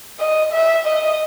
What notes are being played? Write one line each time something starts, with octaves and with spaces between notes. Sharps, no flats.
D#5
E5
D#5